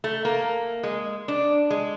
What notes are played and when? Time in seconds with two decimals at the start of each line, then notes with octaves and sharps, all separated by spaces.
0.04 A3
0.25 A#3
0.83 G#3
1.28 D4
1.70 G#3